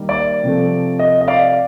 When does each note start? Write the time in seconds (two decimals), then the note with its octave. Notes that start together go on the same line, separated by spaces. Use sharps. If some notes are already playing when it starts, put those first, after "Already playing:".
Already playing: D#3 G3 A#3 D#4
0.09 D5
0.44 C3 F3 A3
0.99 D#5
1.21 D#5
1.28 D5 F5